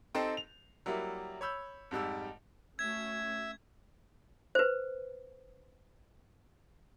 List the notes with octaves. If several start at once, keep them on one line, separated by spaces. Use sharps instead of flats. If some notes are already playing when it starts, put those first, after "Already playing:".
C4 D#4 G4 A4 C5
F7
F#3 G3 A#3 E4
C#5 B5 E6 G6
F2 G#2 G3 E6
A3 C#4 F#4 E5 G#6
B4 C5